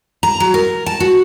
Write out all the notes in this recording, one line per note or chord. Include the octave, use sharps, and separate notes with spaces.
A#5
F#3
A#4
A5
F#4